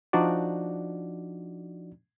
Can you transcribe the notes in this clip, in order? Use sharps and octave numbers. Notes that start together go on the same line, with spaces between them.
F3 D4 D#4 F#4 D5